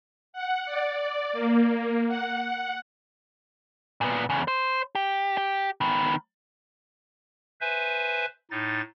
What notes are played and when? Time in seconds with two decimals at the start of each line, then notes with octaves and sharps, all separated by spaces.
0.33 F#5
0.66 D5
1.33 A#3
2.08 F#5
4.01 A#2 B3
4.29 E2 C#3
4.48 C5
4.95 G4
5.37 G4
5.81 D#3 B3
7.61 B4 C5 E5 G#5
8.51 A2 D#4 A6